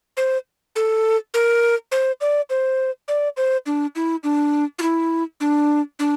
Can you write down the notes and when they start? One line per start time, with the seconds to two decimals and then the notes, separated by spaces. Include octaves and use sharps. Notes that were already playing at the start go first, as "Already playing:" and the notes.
0.17 C5
0.76 A4
1.34 A#4
1.92 C5
2.21 D5
2.50 C5
3.08 D5
3.37 C5
3.66 D4
3.96 E4
4.24 D4
4.79 F4
4.82 E4
5.40 D4
5.99 D4